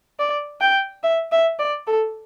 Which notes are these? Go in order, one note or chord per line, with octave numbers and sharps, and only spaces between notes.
D5
G5
E5
E5
D5
A4